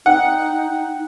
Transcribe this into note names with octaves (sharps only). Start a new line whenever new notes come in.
D#4 F#5 G5